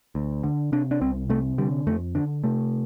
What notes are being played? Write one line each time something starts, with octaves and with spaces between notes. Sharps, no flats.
D2
D3
C3 D4
D4
C2 C4
C3 A3
D3 G3
F2 A3
D3 D4
C3 A3